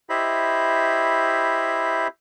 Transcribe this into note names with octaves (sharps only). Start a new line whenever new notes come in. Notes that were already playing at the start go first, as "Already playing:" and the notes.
E4 G4 C5 D#5 E5 B5